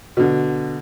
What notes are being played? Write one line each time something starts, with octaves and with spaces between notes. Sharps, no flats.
B2 D3